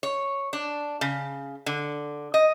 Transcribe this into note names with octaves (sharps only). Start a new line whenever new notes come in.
C#5
D4
C#3
D3
D#5